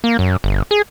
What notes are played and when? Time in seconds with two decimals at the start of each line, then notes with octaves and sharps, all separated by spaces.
0.04 A#3
0.19 F#2
0.44 G1
0.71 G#4